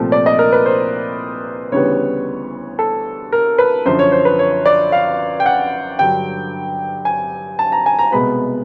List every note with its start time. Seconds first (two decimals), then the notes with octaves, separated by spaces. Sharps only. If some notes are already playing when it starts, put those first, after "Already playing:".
Already playing: C2 A#2 F3 A3 C4
0.12 D5
0.26 D#5
0.39 A#4
0.52 B4
0.66 C5
1.72 D2 C#3 E3 G3 B3 C#5
2.79 A4
3.32 A#4
3.58 B4
3.85 F#2 D3 F3 C5
3.99 C#5
4.12 C5
4.25 B4
4.39 C#5
4.66 D5
4.92 F5
5.40 G5
5.46 F#5
5.99 G2 D3 F#3 G5
7.05 G#5
7.59 A5
7.72 A#5
7.86 G#5
7.99 A#5
8.12 C2 B2 G#3 B3 B5